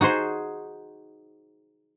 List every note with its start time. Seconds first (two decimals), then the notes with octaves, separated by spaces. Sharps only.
0.01 D#4 F#4 G#4 C5